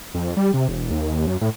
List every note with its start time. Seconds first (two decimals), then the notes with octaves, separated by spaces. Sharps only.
0.14 F2
0.37 G3
0.54 C3
0.69 E1
0.91 D#2
1.27 F#2
1.41 A2